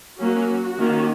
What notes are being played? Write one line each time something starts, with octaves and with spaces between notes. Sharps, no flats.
F#3 A#3 C#4 F#4
D#3 A#3 C#4